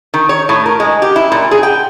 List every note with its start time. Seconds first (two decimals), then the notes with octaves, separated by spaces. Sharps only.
0.14 D#3
0.29 C#5
0.49 A2
0.66 A#4
0.80 G#3
1.02 G4
1.16 E4
1.32 A#2
1.51 G#4
1.63 G5